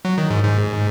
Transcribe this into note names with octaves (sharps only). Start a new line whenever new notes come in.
F#3
D#3
G#2
G#2